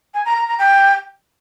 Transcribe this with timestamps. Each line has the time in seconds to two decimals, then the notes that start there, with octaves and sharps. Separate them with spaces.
0.14 G#5
0.25 A#5
0.36 A#5
0.48 A#5
0.59 G5